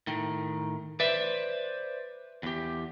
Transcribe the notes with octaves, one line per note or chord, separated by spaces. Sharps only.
A2 D#3
B4 C5 D5 E5
E2 G4